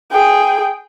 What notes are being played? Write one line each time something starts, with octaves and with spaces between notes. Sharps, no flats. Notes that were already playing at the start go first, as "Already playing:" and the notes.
G#4 G5